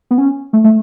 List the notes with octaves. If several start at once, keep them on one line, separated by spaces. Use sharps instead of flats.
B3
C#4
A3
A3